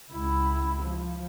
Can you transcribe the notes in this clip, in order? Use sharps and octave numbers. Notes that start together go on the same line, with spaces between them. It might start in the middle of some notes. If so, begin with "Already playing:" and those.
C#2 E4
F3